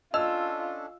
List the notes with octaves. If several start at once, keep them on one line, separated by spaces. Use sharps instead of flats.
C#4 D4 F4 A4 D#5 E6